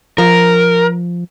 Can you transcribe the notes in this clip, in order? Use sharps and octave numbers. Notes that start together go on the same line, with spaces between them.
F3 A#4